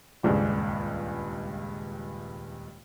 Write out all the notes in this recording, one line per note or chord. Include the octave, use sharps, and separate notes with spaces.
D#1 C#2 G2 G#3